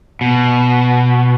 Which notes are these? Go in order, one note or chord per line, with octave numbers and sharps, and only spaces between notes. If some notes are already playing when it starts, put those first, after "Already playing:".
B2